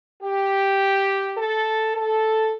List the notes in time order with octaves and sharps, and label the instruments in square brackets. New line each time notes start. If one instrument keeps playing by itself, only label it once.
[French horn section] G4
A4
A4